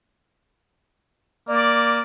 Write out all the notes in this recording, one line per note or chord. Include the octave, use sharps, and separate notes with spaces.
A#3 D5